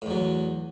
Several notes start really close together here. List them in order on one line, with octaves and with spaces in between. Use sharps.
A2 E2 F#3